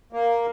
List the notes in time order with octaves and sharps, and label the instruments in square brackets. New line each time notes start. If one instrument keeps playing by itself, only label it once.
[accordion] A#3